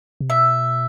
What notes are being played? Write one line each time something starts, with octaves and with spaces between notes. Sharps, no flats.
C3
B2 E5